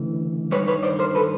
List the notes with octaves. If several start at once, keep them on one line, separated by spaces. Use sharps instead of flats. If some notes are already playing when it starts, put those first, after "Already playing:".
Already playing: D2 C#3 E3
G2 D#3 B4 C#5
B4 C#5
C5 D5
A#4 C5
A4 B4